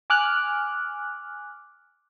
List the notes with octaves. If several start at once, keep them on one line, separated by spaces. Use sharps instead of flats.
G#5 D6 F6 F#6